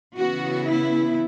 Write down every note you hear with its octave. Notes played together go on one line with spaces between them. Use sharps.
C#3 E3 B3 F#4
E4